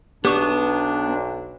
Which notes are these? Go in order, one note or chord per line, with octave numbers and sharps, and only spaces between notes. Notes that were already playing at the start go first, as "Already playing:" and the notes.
B1 B3 D4 G4 C#6 E7